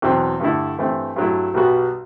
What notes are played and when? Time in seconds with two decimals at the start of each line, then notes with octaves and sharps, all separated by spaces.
0.02 E2 B2 F#3 C4
0.40 G2 D3 A3 E4
0.78 G2 E3 A3 C4
1.16 G2 F#3 A3 E4
1.54 B1 B2 G3 B3 F#4